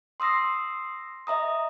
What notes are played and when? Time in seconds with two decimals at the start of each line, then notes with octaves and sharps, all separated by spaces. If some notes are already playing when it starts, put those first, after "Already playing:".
0.20 C6 D#6 E6 A#6 C7
1.27 D#5 E5 A#5 D#6